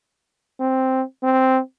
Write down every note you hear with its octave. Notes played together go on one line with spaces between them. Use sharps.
C4
C4